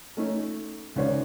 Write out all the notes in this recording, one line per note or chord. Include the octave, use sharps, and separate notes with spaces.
A3 C#4 D#4
C#2 D#3 C#4 C5 D5